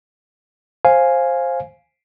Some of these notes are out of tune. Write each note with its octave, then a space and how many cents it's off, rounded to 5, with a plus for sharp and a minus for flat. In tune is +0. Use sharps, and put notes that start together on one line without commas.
C5 +15 F5 +0 G#5 +0